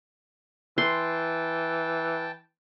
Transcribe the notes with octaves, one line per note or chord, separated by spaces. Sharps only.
E3 G5 A5 C6